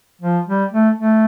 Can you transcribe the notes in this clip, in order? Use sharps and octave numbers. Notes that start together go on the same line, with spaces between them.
F3
G3
A3
A3